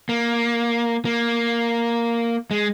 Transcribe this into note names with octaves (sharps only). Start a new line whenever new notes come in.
A#3
A#3
G#3